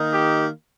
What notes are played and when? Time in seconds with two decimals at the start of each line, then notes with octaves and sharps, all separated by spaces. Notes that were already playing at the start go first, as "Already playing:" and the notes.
Already playing: D#3 A#3 D#4
0.12 G4